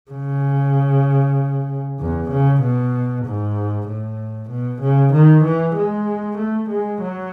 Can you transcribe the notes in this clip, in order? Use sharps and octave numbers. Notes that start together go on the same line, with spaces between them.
C#3
E2
C#3
B2
G#2
A2
B2
C#3
D#3
E3
G#3
A3
G#3
F#3